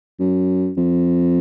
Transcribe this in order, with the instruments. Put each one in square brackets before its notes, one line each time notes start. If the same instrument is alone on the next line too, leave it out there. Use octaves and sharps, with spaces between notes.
[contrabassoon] F#2
F2